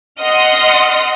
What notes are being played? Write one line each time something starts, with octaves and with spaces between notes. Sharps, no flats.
D#5 F#5 C6 D#6 F6